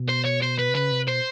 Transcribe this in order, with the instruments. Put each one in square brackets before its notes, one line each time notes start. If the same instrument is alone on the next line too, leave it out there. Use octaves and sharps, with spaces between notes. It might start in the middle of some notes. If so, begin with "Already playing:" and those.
Already playing: [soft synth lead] B2
[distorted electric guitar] C5
C#5
C5
B4
[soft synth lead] C3
[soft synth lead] C#3 [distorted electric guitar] B4
[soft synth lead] C3
[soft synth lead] B2 [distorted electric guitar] C5